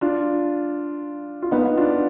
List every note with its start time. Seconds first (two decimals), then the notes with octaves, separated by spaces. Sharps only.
0.01 D4 F4
1.42 F4
1.51 B3 D#4
1.77 D4 F4